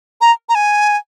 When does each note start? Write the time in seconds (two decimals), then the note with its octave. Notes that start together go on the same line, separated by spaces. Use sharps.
0.21 A#5
0.49 A#5
0.55 G#5